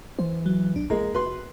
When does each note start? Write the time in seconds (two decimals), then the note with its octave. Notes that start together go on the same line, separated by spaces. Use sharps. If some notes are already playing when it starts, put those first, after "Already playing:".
0.19 E3 C5
0.46 F#3
0.76 B1 D4
0.90 A1 G#3 A#3 A#5
1.14 F1 F#4 B4 C6